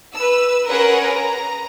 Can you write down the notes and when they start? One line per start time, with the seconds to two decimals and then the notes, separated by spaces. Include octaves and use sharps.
0.14 B4 E6
0.69 C#4 G#4 A#4 B4 F#5
1.12 A#5